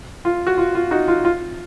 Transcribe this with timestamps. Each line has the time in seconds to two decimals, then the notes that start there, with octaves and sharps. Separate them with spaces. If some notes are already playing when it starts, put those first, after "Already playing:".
0.25 F4
0.47 F#4
0.58 F4
0.75 F4
0.91 D#4 F#4
1.08 F4
1.25 F4